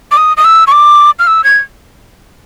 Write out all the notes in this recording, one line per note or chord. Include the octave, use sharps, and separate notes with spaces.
D6
D#6
D#6
E6
C#6
D6
F6
E6
G#6